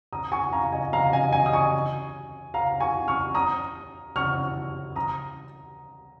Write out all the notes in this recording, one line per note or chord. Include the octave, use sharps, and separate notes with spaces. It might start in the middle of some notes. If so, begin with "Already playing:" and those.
A#5 D#6
G#5 C#6
F5 A#5
D#5 G#5
F5 A#5
D#5 G#5
D#5 G#5
D#6
G#5 C#6
F5 A#5
G#5 C#6
C#6 F6
A#5 D#6
C#6 F6
A#5 D#6